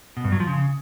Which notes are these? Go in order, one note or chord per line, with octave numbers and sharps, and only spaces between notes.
B2
G2
F#3
F3
C#3